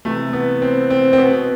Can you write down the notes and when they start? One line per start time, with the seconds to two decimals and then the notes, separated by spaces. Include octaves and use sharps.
0.05 C3 E3 A3
0.33 B3
0.62 C4
0.90 C4
1.13 C4
1.18 B2 B3